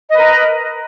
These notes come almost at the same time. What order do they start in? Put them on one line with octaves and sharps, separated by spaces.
D#5 B4 A#4